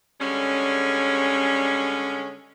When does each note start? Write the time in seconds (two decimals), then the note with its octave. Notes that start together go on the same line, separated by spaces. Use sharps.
0.21 D3 G3 G#3 C#4